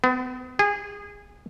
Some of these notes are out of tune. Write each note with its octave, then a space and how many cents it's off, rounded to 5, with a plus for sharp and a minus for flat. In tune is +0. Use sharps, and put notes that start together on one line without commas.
B3 +40
G#4 -25